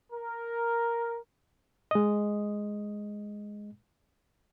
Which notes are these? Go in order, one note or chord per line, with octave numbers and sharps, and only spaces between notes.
A#4
G#3 D#5